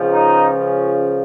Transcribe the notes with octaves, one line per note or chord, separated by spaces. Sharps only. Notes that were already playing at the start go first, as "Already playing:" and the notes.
Already playing: C#2 C#3 F3
D#4
C#4